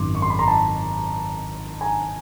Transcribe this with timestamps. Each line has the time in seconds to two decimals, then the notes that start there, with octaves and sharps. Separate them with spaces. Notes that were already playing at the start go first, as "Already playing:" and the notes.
Already playing: G#1 F#2 D#3 C6 D6
0.15 C#6
0.22 C6
0.30 B5
0.39 A#5 C6
0.48 A5 B5
1.81 G#5 A#5